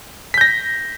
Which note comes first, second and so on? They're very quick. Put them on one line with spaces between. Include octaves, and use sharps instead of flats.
B6 G6 A#6